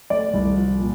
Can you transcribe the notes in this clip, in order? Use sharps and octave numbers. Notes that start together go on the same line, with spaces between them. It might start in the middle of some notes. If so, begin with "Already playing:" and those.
A3 D5
C2
F3
A#2